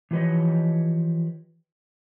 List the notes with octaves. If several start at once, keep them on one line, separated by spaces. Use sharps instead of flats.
E3 F3 G4 B4 C#5 D#5